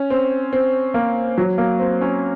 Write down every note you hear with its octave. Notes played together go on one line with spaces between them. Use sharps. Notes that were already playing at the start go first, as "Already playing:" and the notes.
Already playing: C#4
C4
C4
A#3
F#3
A#3
C4
C#4